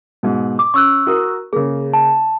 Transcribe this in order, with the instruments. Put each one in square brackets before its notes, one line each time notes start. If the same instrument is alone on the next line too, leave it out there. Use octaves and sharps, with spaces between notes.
[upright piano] G#2 B2
[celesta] D6
[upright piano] C#4 [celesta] C#6 E6 F#6
[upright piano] F#4 A#4 D#6
[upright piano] C#3 A#3 [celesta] G#4
[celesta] A5